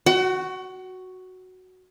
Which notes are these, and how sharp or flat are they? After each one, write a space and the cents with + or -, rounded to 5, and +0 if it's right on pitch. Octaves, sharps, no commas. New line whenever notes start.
F#4 +0 F#5 +35